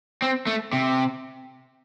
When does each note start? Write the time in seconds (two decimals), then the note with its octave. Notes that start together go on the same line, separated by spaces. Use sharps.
0.22 C4
0.47 A3
0.73 C3